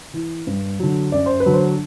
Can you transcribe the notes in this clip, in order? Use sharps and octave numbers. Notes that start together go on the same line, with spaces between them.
E3
G2
D3 F#3
F#2 D5
C5
B4
D3 F#3
C5